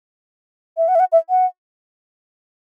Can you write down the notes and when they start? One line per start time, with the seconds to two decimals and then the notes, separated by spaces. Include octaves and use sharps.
0.77 E5
0.88 F#5
0.95 E5
1.00 F#5
1.12 E5
1.30 F#5